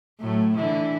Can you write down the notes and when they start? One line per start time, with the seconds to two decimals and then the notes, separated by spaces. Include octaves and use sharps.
0.20 A2 F#3 A3
0.56 D3 E3 E4